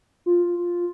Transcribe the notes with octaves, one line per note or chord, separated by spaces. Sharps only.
F4